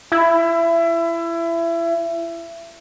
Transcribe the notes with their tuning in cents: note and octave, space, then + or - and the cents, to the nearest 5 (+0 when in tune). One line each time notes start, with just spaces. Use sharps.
E4 +25